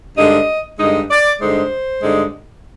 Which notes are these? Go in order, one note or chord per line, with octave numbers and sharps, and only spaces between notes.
G2 D3 G#3 D#4 D#5
G2 D3 G#3 D#4 D#5
D5
G2 D3 G#3 D#4 C5
G2 D3 G#3 D#4